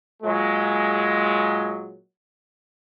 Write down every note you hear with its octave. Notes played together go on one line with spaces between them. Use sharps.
A#2 F#3 G#3